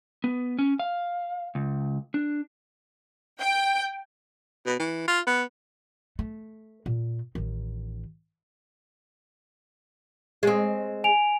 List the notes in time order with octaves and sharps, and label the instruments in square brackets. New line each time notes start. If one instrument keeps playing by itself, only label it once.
[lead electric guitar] B3
C#4
F5
C#2
D4
[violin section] G5
[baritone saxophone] B2
E3
F4
B3
[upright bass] A3
A#2
A1 D#3
[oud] G#3 C4
[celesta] G#5 D7 F7